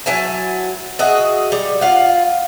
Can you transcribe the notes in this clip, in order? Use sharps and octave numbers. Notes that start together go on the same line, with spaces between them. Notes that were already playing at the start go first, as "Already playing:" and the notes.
F#3 E4 G#5 A5
F#4 G#4 D#5 E5
G3
F4 F5 F#5